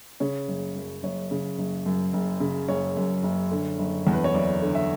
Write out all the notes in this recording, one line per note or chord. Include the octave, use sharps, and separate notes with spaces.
C#3 C#5
F#1
F#2
F#1 C#5
C#3
F#1
F#2
F#1
C#3
F#1 C#5
F#2
F#1
D3
F#1
E2
B4
C#5
F#1 D5
D3
E5